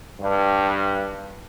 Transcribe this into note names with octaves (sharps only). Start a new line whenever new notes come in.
G2